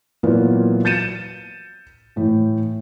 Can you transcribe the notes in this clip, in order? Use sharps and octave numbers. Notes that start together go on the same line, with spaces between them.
A#2 E3 F#3 B3 F4 A#4
G6 A6 C#7 D#7 E7
A2 E3